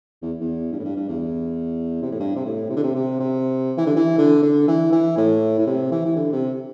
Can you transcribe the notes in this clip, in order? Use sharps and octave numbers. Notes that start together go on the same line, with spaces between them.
E2
E2
G2
A2
G2
G2
E2
C3
A2
G2
C3
A2
C3
D3
C3
C3
C3
E3
D3
E3
D3
D3
E3
E3
A2
A2
C3
E3
E3
D3
C3